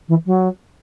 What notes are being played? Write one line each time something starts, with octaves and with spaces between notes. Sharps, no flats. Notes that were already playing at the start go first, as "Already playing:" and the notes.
E3
F#3